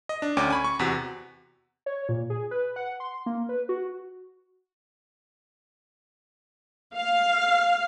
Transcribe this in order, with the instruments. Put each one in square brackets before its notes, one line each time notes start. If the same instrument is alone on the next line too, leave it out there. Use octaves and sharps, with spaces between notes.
[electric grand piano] D#5
D4
D2 C#4 G5 D6
G#5 B5 C#6
C#6
E2 C3 F#4 B6
[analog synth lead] C#5
A#2
G#4
B4
F#5
C6
A#3
B4
F#4
[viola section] F5